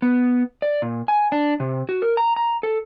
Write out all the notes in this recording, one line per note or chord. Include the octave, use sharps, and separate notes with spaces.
B3
D5
A#2
G#5
D4
C3
F#4
A#4
A#5
A#5
A4